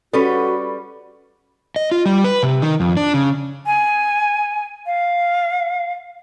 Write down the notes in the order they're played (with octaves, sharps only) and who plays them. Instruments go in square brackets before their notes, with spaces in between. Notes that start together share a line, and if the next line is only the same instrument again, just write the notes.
[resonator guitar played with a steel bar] G3 C#4 B4 [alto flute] F#4 [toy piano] A4
[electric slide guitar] D#5
F4
G3
B4
C3
D#3
F2
D4
C#3
[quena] G#5
F5